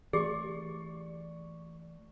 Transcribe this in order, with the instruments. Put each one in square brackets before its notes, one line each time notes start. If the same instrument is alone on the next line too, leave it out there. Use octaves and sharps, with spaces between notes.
[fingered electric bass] E3 A3 [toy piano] G4 G#4 [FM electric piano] D5 C#6